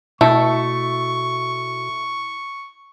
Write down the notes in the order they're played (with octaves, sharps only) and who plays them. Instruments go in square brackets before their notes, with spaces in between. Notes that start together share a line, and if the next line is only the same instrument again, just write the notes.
[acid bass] B2 [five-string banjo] A3 [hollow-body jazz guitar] E4 [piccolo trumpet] C#6